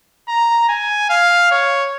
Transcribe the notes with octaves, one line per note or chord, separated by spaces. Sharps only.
A#5
G#5
F5
C#5